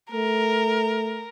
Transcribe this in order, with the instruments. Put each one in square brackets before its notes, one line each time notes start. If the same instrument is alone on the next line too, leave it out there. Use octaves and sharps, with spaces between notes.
[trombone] A3 [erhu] A#4